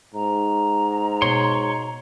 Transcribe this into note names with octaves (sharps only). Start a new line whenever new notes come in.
G#2 A#5
B2 C#5 C6